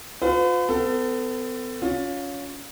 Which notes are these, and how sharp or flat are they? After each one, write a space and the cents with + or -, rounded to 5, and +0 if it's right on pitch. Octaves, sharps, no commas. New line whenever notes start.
F4 +35 B4 +45
B3 +45 A4 +25
C#4 +20 F4 +25